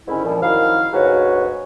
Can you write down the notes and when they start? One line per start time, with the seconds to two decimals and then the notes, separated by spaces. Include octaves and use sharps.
0.08 G#2 D3 D#3 C#4 E4
0.25 A#2 F3
0.43 F#2 D#3 F3 E4 F5
0.93 D2 G#2 F#4 B4 C#5